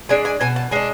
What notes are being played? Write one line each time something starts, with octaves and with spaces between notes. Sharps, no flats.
G#3 D4 G#5
G#5
B2 G#5
A5
G#3 D4 G#5